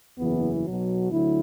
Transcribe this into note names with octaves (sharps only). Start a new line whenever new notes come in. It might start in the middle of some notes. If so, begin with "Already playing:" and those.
F#1 E2 E3 B3
B1 B2 F#3
D2 D3 F#3 E4